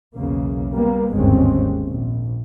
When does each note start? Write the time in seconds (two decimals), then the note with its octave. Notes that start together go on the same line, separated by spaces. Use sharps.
0.16 B1 E2 C#3 A#3
0.74 G3 A#3 B3
1.12 G1 D#2 G#2 G#3 C4 C#4
1.86 A#1